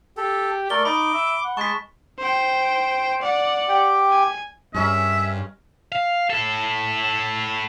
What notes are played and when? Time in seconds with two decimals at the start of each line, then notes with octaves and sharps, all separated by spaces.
0.17 G4 A4
0.70 A3 A#4 D5 G7
0.85 D#4 B5 D6
1.14 E5
1.44 F#5
1.57 G#3 A5 C#6 B6
2.19 C5 G5
3.22 D5 F#5
3.69 G4 G5
4.10 G#5
4.74 G2 G#3 C#4 A#4 E5
5.92 F5
6.30 E4 A4